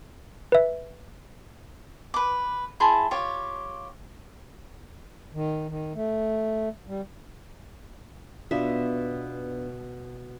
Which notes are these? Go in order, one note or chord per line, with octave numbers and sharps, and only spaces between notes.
B4 E5
B4 D6
E4 G#4 A5 C6
F4 G4 C#5
D#3
D#3
A3
G3
B2 B3 D4 F4 E5